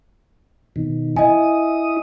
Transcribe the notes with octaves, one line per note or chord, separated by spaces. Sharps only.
B2 D#3
E4 D#5 G#5 D#6